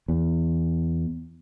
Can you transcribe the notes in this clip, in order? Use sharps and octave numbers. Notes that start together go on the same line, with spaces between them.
E2